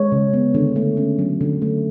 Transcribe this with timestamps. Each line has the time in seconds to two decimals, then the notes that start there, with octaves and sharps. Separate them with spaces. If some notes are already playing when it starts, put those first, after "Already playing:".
Already playing: G#3 C#5
0.12 C#3
0.33 B3
0.54 D3
0.76 A3
0.97 C#4
1.19 F#3
1.41 D3
1.62 A3